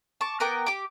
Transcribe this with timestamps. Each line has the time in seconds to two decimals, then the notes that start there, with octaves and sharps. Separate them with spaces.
0.21 A5 C#6 D6
0.40 B3 A#4 G5 D6
0.66 G4 D6